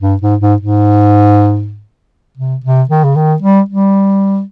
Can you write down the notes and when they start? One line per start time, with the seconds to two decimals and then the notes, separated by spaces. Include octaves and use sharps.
0.01 G2
0.22 G#2
0.41 G#2
0.61 G#2
2.38 C3
2.64 C3
2.89 D#3
3.04 C#3
3.16 D#3
3.42 G3
3.69 G3